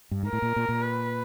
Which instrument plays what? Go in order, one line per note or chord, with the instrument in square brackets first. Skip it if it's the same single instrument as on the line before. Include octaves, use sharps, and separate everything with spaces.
[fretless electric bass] G2
G#2
[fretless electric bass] A2 [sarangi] A#4
[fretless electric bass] A#2
A#2
A#2
[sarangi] B4